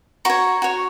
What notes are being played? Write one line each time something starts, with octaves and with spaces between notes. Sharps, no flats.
F#4 C#5 A#5 C#6
F#4 C#5